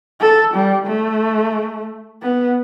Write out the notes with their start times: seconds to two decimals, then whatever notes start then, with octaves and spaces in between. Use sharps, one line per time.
0.20 A4
0.54 G3
0.87 A3
2.22 B3